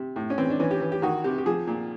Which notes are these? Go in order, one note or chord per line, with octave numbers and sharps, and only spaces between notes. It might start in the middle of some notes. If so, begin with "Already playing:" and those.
Already playing: C3
A2
C#4
E3 C4
D4
E3 C#4
G4
E3
G4
D#3 F#4
C3 G4
G4
F3 G#4
A#2